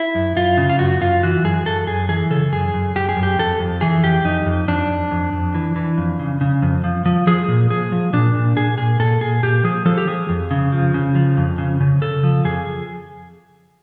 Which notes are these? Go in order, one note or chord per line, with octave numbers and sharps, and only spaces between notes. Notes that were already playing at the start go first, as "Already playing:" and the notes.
Already playing: E4
F#2
F#2 F4
C#3
F4
F#2 F#4
F#2 F4
E3 F#4
F#2 G#4
F#2 A4
F#2 G#4
E3 G#4
C#3 A4
F#2 G#4
F#2
F#2 G4
G#4
F#2
G4
F2 A4
F2
E3 G#4
F2 G4
F2 D#4
F2
F2 D4
F2
F2
F2
E3
E3
F2
C#3
C#3
F2
F3
F3
F3 G#4
A#2
F3 G#4
F3
A#2 D4
A#2
A#2 G#4
A#2 G#4
A#2 A4
A#2 G#4
A#2 G4
F3 G#4
F3 A4
G4
F3 G#4
F2
C#3
F3
C#3
F3
F2
C#3
C#3
C#3 A4
F3
F2 G#4